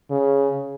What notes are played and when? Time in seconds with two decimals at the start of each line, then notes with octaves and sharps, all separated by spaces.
0.10 C#3